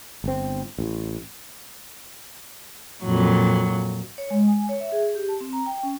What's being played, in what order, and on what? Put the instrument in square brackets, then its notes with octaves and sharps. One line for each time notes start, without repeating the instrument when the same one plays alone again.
[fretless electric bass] G1 C4
A1
[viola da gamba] F2 A#2 F#3
[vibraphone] C#5
G#3
G#5
C#5
E5
G#4
G4
A5
C4
A#5
G5
C#4